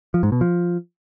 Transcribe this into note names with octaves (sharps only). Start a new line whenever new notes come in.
F3
G#2
B2
F3